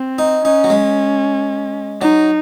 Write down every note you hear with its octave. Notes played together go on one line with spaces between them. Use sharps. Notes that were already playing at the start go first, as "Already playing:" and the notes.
Already playing: C4
D#4
C#4 D#4
F#3
G#3
F#3 D#4